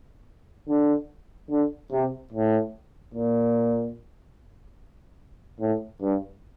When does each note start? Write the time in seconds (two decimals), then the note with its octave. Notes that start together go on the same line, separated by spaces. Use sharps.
0.68 D3
1.50 D3
1.91 C3
2.32 A2
3.14 A#2
5.60 A2
6.01 G2